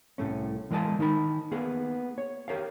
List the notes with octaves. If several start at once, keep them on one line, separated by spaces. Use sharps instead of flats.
C2 A2 A3 C#4
E3 G#3 A#3 D#5 A5
D#3 D#4 A#4 B5
A#3 B3 G#4
C#5
G4 A#4 C#5 F5